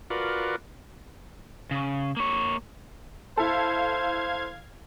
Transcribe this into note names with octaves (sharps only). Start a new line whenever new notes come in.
F4 F#4 A#4 B4 D5
C#3
A#3 C#5
E4 A4 C5 F5 G#6